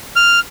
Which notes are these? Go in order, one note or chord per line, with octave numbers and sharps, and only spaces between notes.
F6